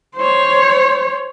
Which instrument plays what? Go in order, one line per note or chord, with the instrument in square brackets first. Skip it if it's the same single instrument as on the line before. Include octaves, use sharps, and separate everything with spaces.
[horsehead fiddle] C5 C#5